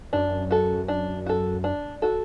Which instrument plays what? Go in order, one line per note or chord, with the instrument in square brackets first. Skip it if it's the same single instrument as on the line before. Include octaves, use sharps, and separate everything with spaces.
[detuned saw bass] F#2 [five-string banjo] D4
[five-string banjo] F#4 A4
D4
F#4 A4
D4
F#4 A4